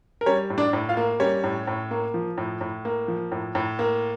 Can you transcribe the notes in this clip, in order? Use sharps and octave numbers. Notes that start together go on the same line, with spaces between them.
A#4
G3 C#4 C#5
A2
D4 D5
A2
F4 F5
A#3
G3 C#4 C#5
A2
A2
A#3
F3
A2
A2
A#3
F3
A2
A2
A#3